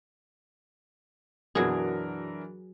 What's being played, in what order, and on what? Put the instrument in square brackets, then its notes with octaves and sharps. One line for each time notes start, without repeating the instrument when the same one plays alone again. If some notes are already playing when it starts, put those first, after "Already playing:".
[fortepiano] F#2 B2 [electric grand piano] E3 D4 A#4 [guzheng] F#3 G#4